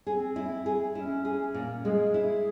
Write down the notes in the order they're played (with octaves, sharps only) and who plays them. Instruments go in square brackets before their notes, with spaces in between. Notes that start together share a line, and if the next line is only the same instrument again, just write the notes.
[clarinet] C4 [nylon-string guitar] G#4
[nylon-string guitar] E4
G#4
[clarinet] C#4 [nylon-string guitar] E4
[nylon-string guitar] G#4
A#2
[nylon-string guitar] G#3 [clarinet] G#4
[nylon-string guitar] E4